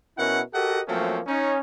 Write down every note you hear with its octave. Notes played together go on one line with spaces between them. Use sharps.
B2 C#4 E4 A#4 F#5
F#4 G4 A4 A#4 D#5 F#5
F3 F#3 A3 A#3 C4 C#4
C#4 D#4